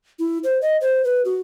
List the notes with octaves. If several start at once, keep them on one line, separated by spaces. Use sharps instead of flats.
E4
C5
D#5
C5
B4
F#4